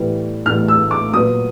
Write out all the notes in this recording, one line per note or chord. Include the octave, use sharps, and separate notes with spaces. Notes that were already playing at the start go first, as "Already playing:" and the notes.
Already playing: A2 E3 G3 B3
A2 E3 G3 B3 F6
E6
D6
A#2 F#3 B3 D#6